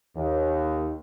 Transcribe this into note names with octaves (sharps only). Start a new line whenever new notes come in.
D#2